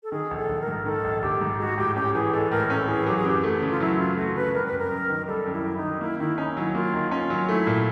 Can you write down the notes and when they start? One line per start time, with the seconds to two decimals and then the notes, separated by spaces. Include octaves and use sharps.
0.03 A4
0.12 D#3 G#4
0.31 A#1
0.37 A4
0.49 A#1
0.61 A#4
0.67 G#2
0.86 D#3 A4
1.04 A#1
1.22 A#1 G4
1.41 G#2
1.59 G#3 F#4
1.77 A2 G4
1.96 C#4 G4
2.14 E3 G#4
2.33 G#3 A4
2.51 A2 A#4
2.70 C#4 A4
2.88 E3 G#4
3.06 F#3 G4
3.17 G#4
3.25 F#2 G4
3.43 A3
3.62 C#3
3.70 F4
3.80 F#3 E4
3.99 F#2 F4
4.17 A3 F#4
4.35 C#3 B4
4.54 G3 A#4
4.66 B4
4.72 F#2
4.78 A#4
4.91 F#2
5.09 D#3
5.28 G3 A4
5.46 F#2
5.52 E4
5.65 F#2
5.77 D#4
5.83 D#3
6.01 A#3 E4
6.19 D#3 E4
6.38 C#4 D#4
6.56 F#3 E4
6.75 A#3 F4
6.93 D#3
7.11 C#4 F4
7.30 F#3
7.48 A3 E4
7.67 A#2